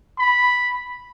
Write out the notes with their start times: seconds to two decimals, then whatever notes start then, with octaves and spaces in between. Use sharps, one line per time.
0.19 B5